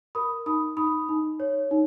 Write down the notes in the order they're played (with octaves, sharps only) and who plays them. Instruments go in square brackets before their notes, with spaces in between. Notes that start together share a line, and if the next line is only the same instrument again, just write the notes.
[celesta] A#4 B5 D#6
D#4 B5 D#6
D#4 B5 D#6
D#4
C#5
D#4